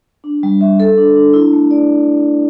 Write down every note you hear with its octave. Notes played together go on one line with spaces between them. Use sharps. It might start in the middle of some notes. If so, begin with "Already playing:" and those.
D4
G3
E5
A4
D4
D4
E4
A3
D5